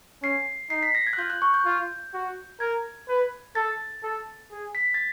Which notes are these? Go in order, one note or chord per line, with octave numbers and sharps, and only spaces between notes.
C#4 C7
D#4 C7
B6
A#6
G#6
F#6
F4 G6
F#6
C#6
G6
F4
F#4
A#4 G#6
B4
A4 A6
A4
G#4
B6
A6